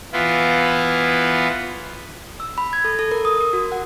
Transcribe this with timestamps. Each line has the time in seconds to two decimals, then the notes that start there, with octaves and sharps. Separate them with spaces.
0.13 E3 B3 E4 F4
2.40 E6
2.58 B5
2.73 G#6
2.85 A4
2.99 A4
3.11 A#4
3.25 D#6
3.40 A#4
3.53 F#4
3.72 F#5